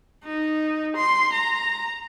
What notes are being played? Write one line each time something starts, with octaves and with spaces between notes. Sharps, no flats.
D#4
C6
A#5